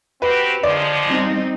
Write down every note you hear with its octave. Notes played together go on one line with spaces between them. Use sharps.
C4 F#4 G4 B4
D3 D#3 F3 G#3 D5
G3 C4 D#4